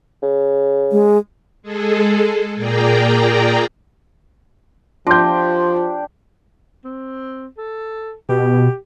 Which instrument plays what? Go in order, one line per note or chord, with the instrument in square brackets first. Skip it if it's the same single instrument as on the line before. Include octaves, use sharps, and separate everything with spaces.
[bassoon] C#3
[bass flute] G#3
[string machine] G#3 G#4 A4
A#2 A#3 G#4 D5 G5 A#5
[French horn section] F3 [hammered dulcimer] D4 G4 [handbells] F4 [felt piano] C6 G6
[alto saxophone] C4
A4
[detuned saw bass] B2 [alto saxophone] G4